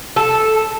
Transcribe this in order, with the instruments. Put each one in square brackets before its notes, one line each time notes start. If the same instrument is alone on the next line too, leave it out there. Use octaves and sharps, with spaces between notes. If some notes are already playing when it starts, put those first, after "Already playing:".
[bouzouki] A4